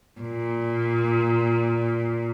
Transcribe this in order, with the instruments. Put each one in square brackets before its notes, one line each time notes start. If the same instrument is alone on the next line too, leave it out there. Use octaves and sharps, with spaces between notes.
[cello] A#2